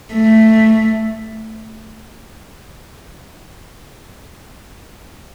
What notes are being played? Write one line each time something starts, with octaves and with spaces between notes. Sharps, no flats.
A3